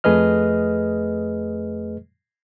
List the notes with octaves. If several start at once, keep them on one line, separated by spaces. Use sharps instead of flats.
F2 A3 G#4 B4 D#5 F6